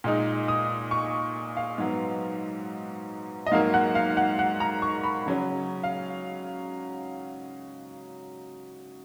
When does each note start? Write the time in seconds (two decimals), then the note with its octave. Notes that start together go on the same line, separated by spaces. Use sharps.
0.04 A#2 G#3 D#4
0.48 D#6
0.91 C#6
1.57 F5
1.78 G#2 F#3 B3
3.46 D#5
3.52 G#2 F#3 A#3 F5
3.74 F#5
3.95 F5
4.17 F#5
4.39 F#5
4.60 A#5
4.82 C#6
5.03 B5
5.26 C#3 F#3 C#4
5.84 F5